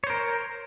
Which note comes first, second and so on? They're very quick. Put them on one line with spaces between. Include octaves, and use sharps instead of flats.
C#5 C5 A#4